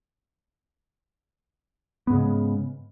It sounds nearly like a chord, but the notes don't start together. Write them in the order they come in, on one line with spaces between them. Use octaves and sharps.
B3 G#2 C#3 G#3